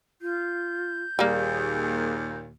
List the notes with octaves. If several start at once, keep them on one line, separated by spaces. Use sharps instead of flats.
F4 G6
D#2 A#2 G3 A#3 G#4